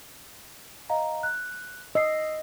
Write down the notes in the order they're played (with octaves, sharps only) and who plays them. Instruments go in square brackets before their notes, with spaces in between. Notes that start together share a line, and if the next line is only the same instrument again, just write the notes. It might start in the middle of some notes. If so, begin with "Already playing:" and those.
[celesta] D#5 F5 A#5
F#6
[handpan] D#5 [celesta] E6 C7